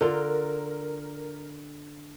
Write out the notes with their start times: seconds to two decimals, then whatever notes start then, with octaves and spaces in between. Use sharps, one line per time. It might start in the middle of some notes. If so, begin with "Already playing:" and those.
0.01 D3 F4 A#4